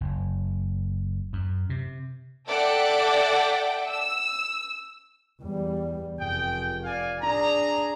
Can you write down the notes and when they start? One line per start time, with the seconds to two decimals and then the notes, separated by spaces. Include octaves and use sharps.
0.01 F#1
1.33 F#2
1.70 C3
2.49 A4 D5 E5 F#5 G5
3.88 E6
5.41 E2 G3
6.19 F1 G#4 G5
6.84 D5 F5 G#5
7.22 D4 G#4 A#5